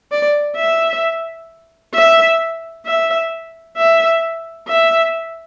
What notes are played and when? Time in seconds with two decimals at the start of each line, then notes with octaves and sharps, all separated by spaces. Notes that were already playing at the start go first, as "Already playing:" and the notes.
0.11 D5
0.56 E5
1.94 E5
2.85 E5
3.77 E5
4.68 E5